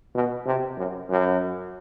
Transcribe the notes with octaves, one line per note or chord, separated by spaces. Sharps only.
B2
C3
F#2
F#2